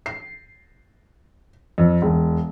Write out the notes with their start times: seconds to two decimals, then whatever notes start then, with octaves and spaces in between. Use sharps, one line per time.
0.06 C7
1.78 F2
2.02 E1